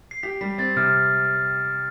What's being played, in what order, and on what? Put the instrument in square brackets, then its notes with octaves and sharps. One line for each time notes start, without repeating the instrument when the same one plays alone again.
[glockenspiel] C7
[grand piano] G4 [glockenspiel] B6
[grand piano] G3 [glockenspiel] B6
[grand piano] C4 [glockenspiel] A6
[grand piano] C3 [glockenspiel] F6